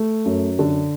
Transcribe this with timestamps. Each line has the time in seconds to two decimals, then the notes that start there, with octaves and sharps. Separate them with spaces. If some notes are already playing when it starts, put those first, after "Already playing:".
Already playing: A3
0.25 F#2
0.59 D3